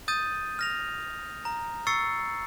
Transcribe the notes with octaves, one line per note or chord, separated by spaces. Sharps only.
D#6 G6 A6 D#7
F6 A#6 F7
A#5
C#6 E6 A6 C7 C#7